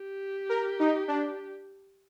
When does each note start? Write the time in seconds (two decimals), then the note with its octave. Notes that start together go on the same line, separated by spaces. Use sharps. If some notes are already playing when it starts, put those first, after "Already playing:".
Already playing: G4
0.49 A#4
0.80 D#4
1.08 D4